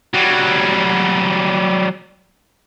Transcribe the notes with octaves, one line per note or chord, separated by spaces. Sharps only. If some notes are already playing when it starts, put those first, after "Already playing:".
F#3 G3